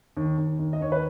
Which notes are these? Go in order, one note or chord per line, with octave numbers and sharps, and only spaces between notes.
D#2
D#2
D#2
D#5
D#2 C#5
B4